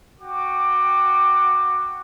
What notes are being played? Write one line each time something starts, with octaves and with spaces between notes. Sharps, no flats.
F#4 G5 D6